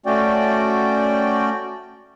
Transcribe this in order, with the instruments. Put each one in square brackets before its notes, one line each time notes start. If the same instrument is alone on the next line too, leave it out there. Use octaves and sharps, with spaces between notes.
[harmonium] A3 C#4 F#4 D5 G5